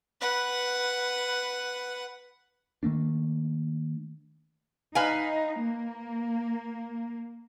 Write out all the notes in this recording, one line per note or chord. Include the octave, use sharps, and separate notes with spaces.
B4 F#5
D#3 A3 A#3 D4
D#4 B4 F5 G#5
A#3